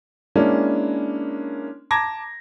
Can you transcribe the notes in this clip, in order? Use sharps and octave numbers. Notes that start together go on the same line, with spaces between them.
G#3 A#3 C#4 D4 E4
A5 A#5 D6 G#6 A#6